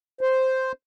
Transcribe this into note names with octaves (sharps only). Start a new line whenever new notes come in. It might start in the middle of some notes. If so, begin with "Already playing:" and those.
C5